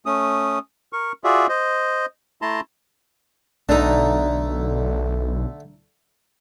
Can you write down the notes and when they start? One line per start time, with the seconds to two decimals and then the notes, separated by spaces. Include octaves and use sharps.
0.06 A3 C#4 D#6
0.93 A#4 C#6
1.24 F4 F#4 G#4 D5 E5
1.49 C5 D#5
2.42 A3 E4 A5 A#5 C6
3.69 B1 D3 A3 D4 D#4